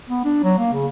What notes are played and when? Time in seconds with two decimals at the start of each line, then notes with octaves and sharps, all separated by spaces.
0.09 B3
0.25 D4
0.43 F#3
0.58 A#3
0.72 C#3